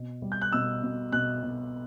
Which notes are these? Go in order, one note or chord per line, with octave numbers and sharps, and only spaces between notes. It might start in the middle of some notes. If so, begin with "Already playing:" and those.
Already playing: B2
G3
G6
F#6
B2 E6
B2
B2 F#6
B2